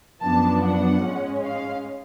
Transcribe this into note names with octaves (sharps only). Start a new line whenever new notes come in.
F#2 F3 B3 D4 A5
F#5
G#2 G#3 C#4
F5